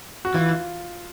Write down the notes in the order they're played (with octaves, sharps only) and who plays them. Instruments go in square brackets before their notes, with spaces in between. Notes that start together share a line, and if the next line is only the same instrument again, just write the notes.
[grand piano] F#4
[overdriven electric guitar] E3 [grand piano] F4